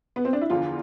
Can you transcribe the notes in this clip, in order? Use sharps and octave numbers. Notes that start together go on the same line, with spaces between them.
B3
C4
D4
E4
E2 D3 F3 F4